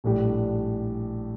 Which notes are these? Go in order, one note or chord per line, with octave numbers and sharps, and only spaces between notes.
A#1 A2 G3 D4 G4